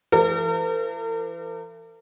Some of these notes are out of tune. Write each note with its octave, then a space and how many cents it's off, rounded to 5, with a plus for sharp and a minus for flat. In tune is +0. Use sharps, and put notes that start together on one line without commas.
E3 +40 A#4 -45